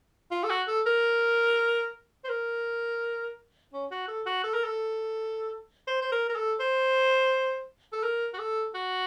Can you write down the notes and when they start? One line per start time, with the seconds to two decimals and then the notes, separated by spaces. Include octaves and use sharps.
0.31 F4
0.44 A4
0.50 F#4
0.68 A4
0.86 A#4
2.25 C5
2.29 A#4
3.73 C#4
3.91 F#4
4.08 A4
4.26 F#4
4.44 A4
4.54 A#4
4.65 A4
5.88 C5
6.02 C5
6.12 A#4
6.29 A#4
6.36 A4
6.60 C5
7.93 A4
8.03 A#4
8.34 F#4
8.39 A4
8.75 F#4